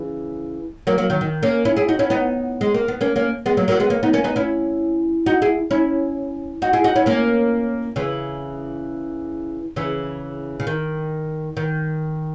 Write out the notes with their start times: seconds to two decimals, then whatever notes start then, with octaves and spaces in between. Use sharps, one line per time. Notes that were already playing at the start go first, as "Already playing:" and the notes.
Already playing: C#3 E3
0.87 F#3 A#3
0.98 F#3 A#3
1.10 D#3 F#3
1.21 D#3
1.42 A#3 C#4
1.65 C#4 E4
1.76 E4 G#4
1.89 D#4 F#4
1.99 C#4 E4
2.10 B3 D#4
2.61 G#3
2.74 A#3
2.88 B3
3.01 A#3 C#4
3.16 A#3 C#4
3.46 G#3 B3
3.57 F#3 A#3
3.68 F#3 A#3
3.80 G#3 B3
3.90 A#3 C#4
4.03 B3 D#4
4.13 A#3 C#4
4.24 B3 D#4
4.36 C#4 E4
5.26 D#4 F#4
5.42 E4 G#4
5.71 C#4 E4
6.62 D#4 F#4
6.73 E4 G#4
6.84 D#4 F#4
6.96 C#4 E4
7.06 A#3 C#4
7.96 C#3 E3
9.76 C#3 E3
10.60 C#3
10.67 D#3
11.57 D#3